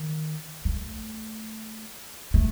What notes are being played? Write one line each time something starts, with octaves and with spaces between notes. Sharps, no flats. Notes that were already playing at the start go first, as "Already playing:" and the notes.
Already playing: D#3
A3
A3